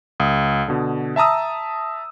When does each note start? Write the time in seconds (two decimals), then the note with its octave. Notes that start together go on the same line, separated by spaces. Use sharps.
0.20 C#2 D#6
0.68 B2 D3
1.16 E5 A5 A#5 D#6 E6